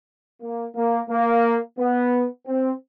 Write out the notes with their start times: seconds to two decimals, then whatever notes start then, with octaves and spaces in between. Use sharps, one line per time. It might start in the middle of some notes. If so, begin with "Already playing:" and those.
0.41 A#3
0.75 A#3
1.09 A#3
1.78 B3
2.46 C4